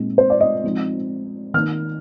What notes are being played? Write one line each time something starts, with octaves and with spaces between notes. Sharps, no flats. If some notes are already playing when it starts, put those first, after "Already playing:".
Already playing: A#2 G#3 C4 D#4
C5
D5
D#5
F3 G#3 C4 D#4
D#3 A#3 D#4 F6